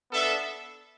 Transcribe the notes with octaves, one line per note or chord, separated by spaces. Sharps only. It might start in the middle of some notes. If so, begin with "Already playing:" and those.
B3 D4 A4 E5